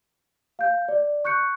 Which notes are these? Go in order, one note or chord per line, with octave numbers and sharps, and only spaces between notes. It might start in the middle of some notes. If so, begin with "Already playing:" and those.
F5 G6
D5
C#6 F#6 G6 C#7